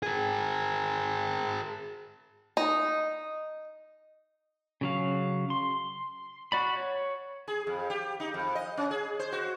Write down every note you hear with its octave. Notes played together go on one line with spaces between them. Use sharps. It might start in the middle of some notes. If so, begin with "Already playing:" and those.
G#4 A#4
D#4
C#3 F#3 F5
C6
F#4 D5 B5
C#5
G#4
F2
G4
D#4
F2
D#5
C#4
G#4
C5
F#4